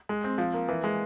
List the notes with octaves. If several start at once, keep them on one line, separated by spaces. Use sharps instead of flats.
G#3
C4
F3
A#3
E3
G#3